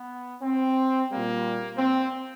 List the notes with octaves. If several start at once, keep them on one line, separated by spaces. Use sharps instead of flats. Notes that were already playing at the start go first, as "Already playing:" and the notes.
Already playing: B3
C4
A#2 G3 A#3
C4